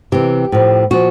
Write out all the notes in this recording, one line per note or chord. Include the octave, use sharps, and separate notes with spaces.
C3 E3 G4
A2 F3
A#2 F3 F#4